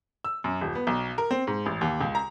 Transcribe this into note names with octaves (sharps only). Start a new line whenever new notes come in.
E6
F#2
D#1
B3
B1
A#4
C4
G#2
A1
D#2
C#2
A#5